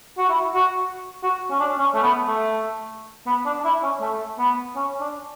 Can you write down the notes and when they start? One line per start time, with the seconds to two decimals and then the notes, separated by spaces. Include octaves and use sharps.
0.18 F#4
0.29 E4
0.55 F#4
1.23 F#4
1.50 C#4
1.60 D4
1.78 C#4
1.94 A3
2.02 B3
2.28 A3
3.26 B3
3.46 D4
3.60 D4
3.64 E4
3.83 C#4
4.01 A3
4.39 B3
4.76 C#4
5.00 D4